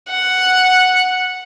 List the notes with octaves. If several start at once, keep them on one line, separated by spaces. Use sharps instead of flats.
F#5